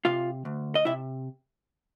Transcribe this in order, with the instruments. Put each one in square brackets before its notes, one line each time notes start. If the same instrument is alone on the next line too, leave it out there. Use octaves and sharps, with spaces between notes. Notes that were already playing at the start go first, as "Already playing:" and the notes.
[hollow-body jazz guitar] C3 F4 F5
D2
D#5
C3 E4 E5